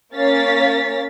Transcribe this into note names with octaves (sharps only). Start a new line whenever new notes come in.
A#3 C#4 C#5 F5 A6 B6